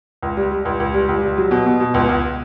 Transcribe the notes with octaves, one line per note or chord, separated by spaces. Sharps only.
C#2
G3
G3
C#2
C#2
G3
C#2
G3
F#3
B2
B2
B2
C#2
C#2